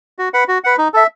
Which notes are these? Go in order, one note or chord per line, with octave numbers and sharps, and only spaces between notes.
F#4
B4 F#5
F#4
B4 F#5
D#4
A4 E5